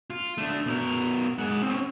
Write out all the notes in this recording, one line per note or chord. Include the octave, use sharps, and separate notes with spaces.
F4
A3 D4
B2 A#4
G#3 F#5
C4 C#4